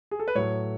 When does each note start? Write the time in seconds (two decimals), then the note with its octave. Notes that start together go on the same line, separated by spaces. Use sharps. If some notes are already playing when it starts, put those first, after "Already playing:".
0.11 G#4
0.20 A4
0.28 B4
0.35 A2 F#3 A3 C#5